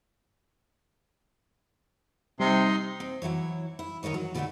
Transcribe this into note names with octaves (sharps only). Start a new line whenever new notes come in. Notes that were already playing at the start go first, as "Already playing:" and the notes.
C3 G3 D#4 C6
C4
E3 F#3 E4 C#5
E4
D#3 D#4 A#4 C#5 D#5
F#3
B2 D3 D#3 A3 D4 F#4